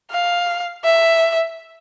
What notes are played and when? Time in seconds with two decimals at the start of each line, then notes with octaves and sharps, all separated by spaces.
0.11 F5
0.84 E5